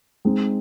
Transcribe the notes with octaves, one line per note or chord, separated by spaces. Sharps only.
G#3 C4 D#4